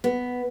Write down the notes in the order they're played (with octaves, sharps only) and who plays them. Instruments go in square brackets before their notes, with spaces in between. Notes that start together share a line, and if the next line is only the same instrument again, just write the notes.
[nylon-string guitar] B3